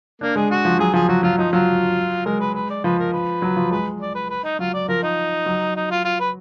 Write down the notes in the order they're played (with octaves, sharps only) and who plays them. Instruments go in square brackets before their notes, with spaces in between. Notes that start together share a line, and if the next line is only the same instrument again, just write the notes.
[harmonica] A#3 [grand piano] D4
[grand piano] G#3 [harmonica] G#4
[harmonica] F#4
[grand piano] F3
[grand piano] F#3 [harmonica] G#4
[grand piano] F3 [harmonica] G#4
[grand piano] F#3 [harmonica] F#4
[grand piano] F#3 [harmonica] F4
[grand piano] F3 [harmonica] D#4
[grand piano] F#3 [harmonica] F4
[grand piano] G#3 [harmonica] A#4
[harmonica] B4
B4
D5
[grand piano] F3 [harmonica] B4
[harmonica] A#4
B4
[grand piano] F#3
F3
[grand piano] G#3 [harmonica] B4
[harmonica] D5
B4
B4
D#4
[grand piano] F#3 [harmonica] F4
[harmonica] D5
[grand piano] F3 [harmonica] A#4
[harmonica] D#4
[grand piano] F#3
[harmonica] D#4
F4
F4
B4